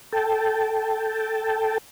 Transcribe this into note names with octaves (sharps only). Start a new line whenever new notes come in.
A4 G5 A5